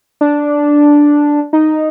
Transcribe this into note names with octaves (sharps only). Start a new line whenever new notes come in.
D4
D#4